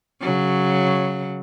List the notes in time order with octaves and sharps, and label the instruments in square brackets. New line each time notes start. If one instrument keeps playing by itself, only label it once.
[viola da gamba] C#3 F#3